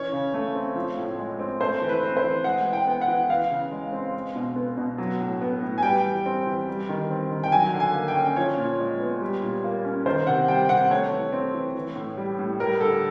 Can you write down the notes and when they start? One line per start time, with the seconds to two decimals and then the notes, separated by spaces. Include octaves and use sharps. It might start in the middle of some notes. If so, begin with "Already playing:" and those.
Already playing: E3 C#4 C#5
0.13 C#3
0.34 A3
0.55 C4
0.76 F3
0.97 A2
1.18 G#3
1.39 C4
1.60 A3 C5
1.82 E3
1.89 B4
2.03 C4
2.17 C5
2.24 E3
2.44 G#3 F#5
2.65 E3
2.73 G5
2.87 B3
3.01 F#5
3.08 E3
3.29 E3 F5
3.50 C#3
3.71 G#3
3.93 C4
4.14 G#3
4.35 B2
4.56 B3
4.77 B2
4.98 F#3
5.20 A2
5.41 B3
5.62 A2
5.78 G#5
5.83 G3 G5
6.04 E3
6.26 C4
6.46 E3
6.68 G3
6.89 D#3
7.10 C4
7.31 D#3
7.44 G5
7.52 F#3 G#5
7.74 D3
7.80 G#5
7.95 A#3
8.08 G5
8.16 C#4
8.36 F3 C#5
8.57 A#2
8.79 G#3
9.00 B3
9.22 G3
9.42 A#2
9.64 A#3
9.85 C#4
10.06 D#3 C5
10.27 C3 F#5
10.48 G3 G5
10.69 C3 F#5
10.90 A3 C#5
11.11 E3
11.32 C4
11.54 E3
11.75 E3
11.96 A2
12.17 G3
12.39 A2
12.59 G3 A#4
12.80 D3 A4